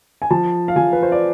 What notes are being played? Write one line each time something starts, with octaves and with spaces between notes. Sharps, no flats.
G#5
F3 A5
F5
F3 G#5
B4
C5
D5